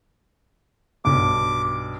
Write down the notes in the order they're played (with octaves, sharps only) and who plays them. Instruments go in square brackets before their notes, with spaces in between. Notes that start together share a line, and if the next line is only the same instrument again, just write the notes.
[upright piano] B1 G2 [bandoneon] D6